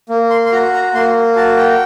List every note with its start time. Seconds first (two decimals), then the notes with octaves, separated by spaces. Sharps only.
0.09 A#3
0.30 C6
0.46 C6
0.52 F#4 A#5
0.73 A#5
0.94 A#3 C6
1.36 F#4 A5
1.57 G5